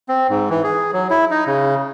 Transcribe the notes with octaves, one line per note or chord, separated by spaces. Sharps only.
C4
G#2
E3
G#4
F#3
E4
D#4
C#3